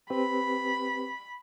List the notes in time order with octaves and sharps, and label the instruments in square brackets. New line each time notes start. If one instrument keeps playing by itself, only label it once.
[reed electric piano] C4 G4 B4 [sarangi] B5